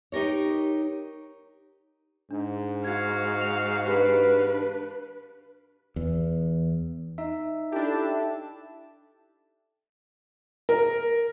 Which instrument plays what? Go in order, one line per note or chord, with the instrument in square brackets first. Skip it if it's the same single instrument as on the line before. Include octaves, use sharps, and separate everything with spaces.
[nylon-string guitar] D#4 G4 A#4 C#5
[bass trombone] G#2 [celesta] D4
[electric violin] F#4 F5 [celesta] G#6
[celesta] F7
[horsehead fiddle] D4 B4 [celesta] G4
[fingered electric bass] E2
[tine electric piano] D#4 E5
[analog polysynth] D4 G4 [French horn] E4 [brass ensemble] A4 A5
[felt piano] A#4